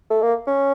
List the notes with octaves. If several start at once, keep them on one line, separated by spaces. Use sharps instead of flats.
A3
A#3
C#4